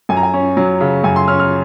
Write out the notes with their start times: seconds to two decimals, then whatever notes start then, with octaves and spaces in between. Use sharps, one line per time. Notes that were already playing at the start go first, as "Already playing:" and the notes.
0.09 F#2 G#5
0.17 A#5
0.23 G#5
0.34 C#4
0.57 F#3
0.81 C#3
1.04 F#2 G#5
1.16 C6
1.28 C#4 F6
1.40 F6